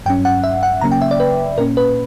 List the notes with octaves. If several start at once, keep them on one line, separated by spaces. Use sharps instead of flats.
G2 F#3 C#4 G5
F#5
E5
F#5
C#3 F#3 A#3 C#4 A#5
G5
E5
D5
B4
A#2 A#3 C#4 A#4
B4